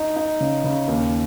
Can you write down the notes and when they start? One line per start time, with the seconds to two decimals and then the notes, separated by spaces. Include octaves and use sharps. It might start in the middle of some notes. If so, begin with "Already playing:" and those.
Already playing: D#4
0.16 D#4
0.40 C#3
0.64 C#3
0.88 D#2